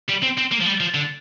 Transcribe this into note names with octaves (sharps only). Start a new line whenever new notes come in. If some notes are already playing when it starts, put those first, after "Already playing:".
G3
C4
C4
A#3
F3
G3
F3
D3